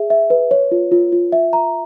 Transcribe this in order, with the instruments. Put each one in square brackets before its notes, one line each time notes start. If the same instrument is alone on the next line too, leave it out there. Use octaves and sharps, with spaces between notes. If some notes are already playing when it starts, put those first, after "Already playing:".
Already playing: [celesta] G#4 E5
E5
B4
C#5
F4
F4
F4
E5
A#5